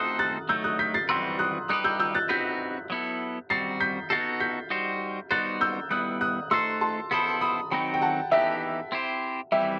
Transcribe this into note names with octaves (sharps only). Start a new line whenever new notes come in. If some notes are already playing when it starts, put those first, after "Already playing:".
Already playing: A3 C4 D#4 A4 C5 D#6 F#6
F#6 A6
F#3 A3 D#4 E6 G6
D#6 F#6
G6 B6
A6 C7
E3 G3 C4 F#4 B4 C6 E6
D#6 F#6
G3 D#4 G4 B4 D#6 F#6
E6 G6
E6 G6
F#6 A6
C4 D#4 F#4 B4 G6 B6
F#3 B3 E4 A4
G3 C4 F#4 A6 C7
G6 B6
B3 D#4 F#4 A4 A6 C7
G6 B6
G3 D#4 F#4 C5
G3 B3 D#4 F#4 C5 F#6 A6
E6 G6
G3 B3 E4 D#6 F#6
D#6 F#6
A3 D#4 A4 C5 C6 E6
A5 C6
B3 E4 A4 C5 B5 D#6
B5 D#6
D#3 F#3 C4 D#4 F#4 G5 B5
G5
F#5 A5
E3 B3 D#4 G4 B4 E5 G5
C4 E4 G4 C5
E3 G3 C4 E4 E5 G5